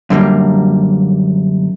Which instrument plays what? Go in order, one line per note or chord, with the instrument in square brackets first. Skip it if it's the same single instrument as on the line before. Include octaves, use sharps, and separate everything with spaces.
[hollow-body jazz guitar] F#2 D3 G3 A#3